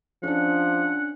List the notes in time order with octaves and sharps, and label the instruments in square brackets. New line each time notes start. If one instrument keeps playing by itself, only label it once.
[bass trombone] F3 [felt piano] C#4 D4 [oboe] F#5